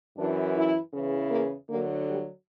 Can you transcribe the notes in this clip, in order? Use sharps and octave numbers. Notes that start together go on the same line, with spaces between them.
F#2 E3 D4
E4
E2 C#3 E3
A#3
D2 D3 F#3 A#3
G3